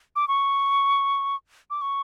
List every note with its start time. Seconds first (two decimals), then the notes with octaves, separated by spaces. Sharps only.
0.16 D6
0.28 C#6
1.70 D6
1.82 C#6